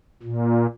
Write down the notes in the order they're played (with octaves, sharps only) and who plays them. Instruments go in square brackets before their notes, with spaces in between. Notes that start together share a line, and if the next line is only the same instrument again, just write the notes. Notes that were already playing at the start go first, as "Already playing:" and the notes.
[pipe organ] A#2